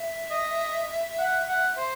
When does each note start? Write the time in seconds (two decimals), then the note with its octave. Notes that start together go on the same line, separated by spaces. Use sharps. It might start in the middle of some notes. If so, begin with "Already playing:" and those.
Already playing: E5
0.31 D#5
1.19 F#5
1.48 F#5
1.77 C5